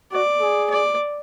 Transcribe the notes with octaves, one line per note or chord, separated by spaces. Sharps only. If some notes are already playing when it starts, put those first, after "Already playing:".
F#4 D5
G#4
D5